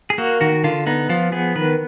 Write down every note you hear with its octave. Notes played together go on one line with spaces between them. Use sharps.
G#4
A#3 F#4
D#3 F#4
D3 F4
B3 D#4
F3 F4
B3 G#4
D#3 B4